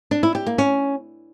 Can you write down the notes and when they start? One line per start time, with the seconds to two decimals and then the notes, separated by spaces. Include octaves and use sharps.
0.11 D4
0.23 E4
0.35 G4
0.47 A#3
0.58 C#4